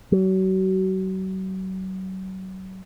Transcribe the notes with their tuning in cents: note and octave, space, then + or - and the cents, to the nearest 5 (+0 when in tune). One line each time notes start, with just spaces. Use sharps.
F#3 +35